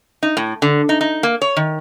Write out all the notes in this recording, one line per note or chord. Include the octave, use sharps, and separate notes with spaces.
D#4
A2
D3
D#4
D#4
A#3
C#5
D#3